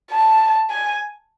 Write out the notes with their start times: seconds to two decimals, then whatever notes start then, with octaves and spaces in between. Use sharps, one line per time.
0.11 A5
0.70 G#5